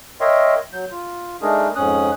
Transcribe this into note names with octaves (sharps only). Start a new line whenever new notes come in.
A#4 C#5 D#5 E5 G5 C6
F#3 G6
F4
G#3 A3 D4 D#4 G#4 A#4
F2 G#2 C#4 D#6 F#6